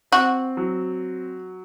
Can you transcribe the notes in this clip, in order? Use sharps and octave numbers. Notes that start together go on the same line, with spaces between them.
C4 F#4
F#3